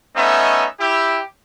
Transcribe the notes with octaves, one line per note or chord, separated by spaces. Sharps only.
A3 B3 C#4 D#4 D#5 E5
E4 G4